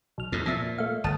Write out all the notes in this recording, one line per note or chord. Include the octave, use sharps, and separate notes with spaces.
B1 F6
E2 A2
F2 A#2 E5
A3 F5
G1 A5 D#6